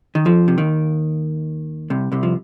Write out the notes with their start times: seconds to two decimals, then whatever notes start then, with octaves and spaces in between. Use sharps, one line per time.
0.15 D#3
0.25 F2 F3
0.48 C3
0.58 D#2 D#3
1.90 C2 C3
2.12 C2 C3
2.23 F3